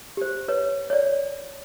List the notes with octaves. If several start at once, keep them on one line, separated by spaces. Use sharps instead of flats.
G4 C5
B4 C#5
C#5 D5